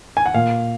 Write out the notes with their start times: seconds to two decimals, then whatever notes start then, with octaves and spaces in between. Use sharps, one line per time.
0.17 G#5
0.26 F#5
0.34 A#2 F5